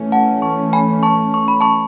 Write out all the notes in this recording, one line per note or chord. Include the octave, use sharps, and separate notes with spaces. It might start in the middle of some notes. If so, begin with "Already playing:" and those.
Already playing: E3 A3 C#4
F#5 A5
A5 C#6
G#5 B5
A5 C#6
C#6
B5
A5 C#6